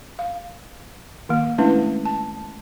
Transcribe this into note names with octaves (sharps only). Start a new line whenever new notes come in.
F5
D#3 A#3
G#3 A3 C#4 D4 E4 B4
A5